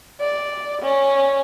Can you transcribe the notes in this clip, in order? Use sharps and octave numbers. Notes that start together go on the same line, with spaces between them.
D5
C#4